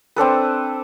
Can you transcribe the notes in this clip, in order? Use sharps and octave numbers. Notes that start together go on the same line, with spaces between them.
C4 D4 A4 B4